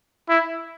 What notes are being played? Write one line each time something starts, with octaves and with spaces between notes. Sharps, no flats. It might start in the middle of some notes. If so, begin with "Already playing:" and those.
E4